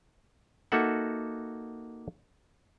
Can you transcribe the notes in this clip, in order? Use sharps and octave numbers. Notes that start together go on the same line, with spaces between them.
A#3 D#4 F#4 A4 E5 F#5